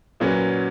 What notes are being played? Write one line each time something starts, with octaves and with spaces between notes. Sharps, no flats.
A#2 F#3 C#4 F#4 B4